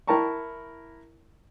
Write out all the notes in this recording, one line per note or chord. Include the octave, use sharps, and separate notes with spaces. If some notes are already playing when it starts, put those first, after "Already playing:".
E4 A#4 G5 A5 A#5 C#6